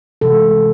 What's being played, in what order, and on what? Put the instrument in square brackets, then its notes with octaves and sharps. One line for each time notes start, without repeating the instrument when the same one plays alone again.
[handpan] C3 E3 G#3 A4